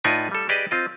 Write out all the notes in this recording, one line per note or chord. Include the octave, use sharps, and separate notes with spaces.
A2 D#4 F4 B4 D5 G#5
G3 A4
G4 G#4 B4 D5 D#5
C4 F4 D#5